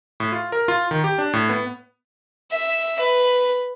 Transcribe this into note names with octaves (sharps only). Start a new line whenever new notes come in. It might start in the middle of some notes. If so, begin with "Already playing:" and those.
A2
F4
A#4
F4
D#3
G4
D4
A2
B3
E5
B4